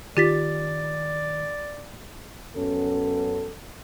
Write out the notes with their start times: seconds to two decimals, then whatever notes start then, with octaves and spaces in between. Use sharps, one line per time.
0.17 D#3 F4 G4 D5 A6 B6
2.57 F#2 B3 C#4 A4